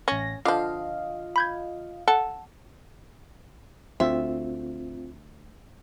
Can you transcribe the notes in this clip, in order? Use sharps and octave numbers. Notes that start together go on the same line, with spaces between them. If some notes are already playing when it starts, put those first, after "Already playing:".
A1 C#4 A#6
D3 F3 F4 D#5 F5
B5 G6 G#6
A4 F#5
D2 C4 F4 E5